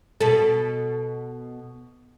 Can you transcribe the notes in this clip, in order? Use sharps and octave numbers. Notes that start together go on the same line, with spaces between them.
B2 A4